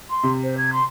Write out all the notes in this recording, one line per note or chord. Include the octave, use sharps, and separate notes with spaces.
C6
C3
C5
G#6
C6